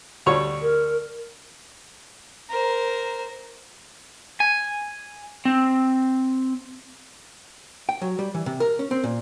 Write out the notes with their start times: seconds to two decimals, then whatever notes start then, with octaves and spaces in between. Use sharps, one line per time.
0.26 D2 G3 C#5
0.63 A#4
2.49 A#4 C5
4.40 G#5
5.45 C4
7.89 G5
8.02 F#3
8.19 G3
8.35 E3
8.46 C3
8.60 A#4
8.79 C#4
8.91 C4
9.04 A#2